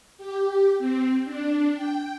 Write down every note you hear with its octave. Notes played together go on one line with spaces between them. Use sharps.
G4
C4
D4
G5